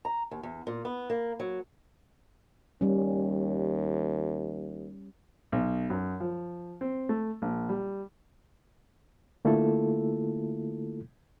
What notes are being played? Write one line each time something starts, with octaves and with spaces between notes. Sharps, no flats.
A#5
D#2
E2
A#2
B3
A#3
F#3
D#2 G3 C#4
B1
F#2
F3
C4
A3
A#1
G3
D3 A3 A#3 E4 F4 A4